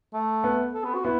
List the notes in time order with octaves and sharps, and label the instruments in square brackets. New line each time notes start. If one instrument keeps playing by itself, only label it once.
[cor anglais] A3
[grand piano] B3
[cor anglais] A4
B3
F#4
[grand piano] B3 [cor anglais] E4